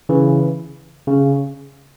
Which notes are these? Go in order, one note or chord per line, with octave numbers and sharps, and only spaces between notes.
C#3 E3
C#3